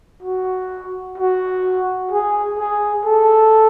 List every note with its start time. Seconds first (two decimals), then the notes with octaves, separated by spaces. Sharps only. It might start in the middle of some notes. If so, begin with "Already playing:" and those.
0.23 F#4
1.18 F#4
2.11 G#4
2.59 G#4
3.05 A4